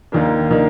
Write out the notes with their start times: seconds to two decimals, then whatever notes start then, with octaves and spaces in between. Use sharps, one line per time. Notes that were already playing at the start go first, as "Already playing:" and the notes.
0.12 D#2 D#3 A#3 D4
0.51 D#3 A#3 D4